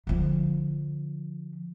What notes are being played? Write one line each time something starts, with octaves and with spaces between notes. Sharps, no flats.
D3 F3